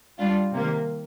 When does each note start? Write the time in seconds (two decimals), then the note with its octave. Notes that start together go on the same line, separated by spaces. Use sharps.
0.18 G3 D4 F4
0.52 C3 D#3 A#3